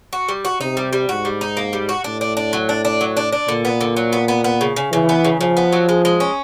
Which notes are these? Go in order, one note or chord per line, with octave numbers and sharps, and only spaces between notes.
F#4
G3
F#4
C3 D#4
G3
G3
G#2 F#4
G3
D#4
A#3
G3
F#4
A2 D4
D4
D4
F#3
D4
D4
F#3
D4
D4
A#2 D3
B3
D3
F#3
B3
B3
B3
C#3
C#3
C#3 E3
B3
C#3
C#3 F3
B3
F#3
G#3
G#3
C#4